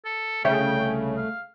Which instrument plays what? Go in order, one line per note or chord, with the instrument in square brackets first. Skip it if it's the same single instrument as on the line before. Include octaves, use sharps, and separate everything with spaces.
[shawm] A4
[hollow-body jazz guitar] C2 C#5 E5 [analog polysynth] C#3 [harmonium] A3 [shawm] G5
[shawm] F5